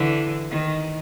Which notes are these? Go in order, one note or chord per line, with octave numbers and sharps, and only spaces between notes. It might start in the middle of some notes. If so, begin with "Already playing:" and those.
Already playing: D3 E3
D#3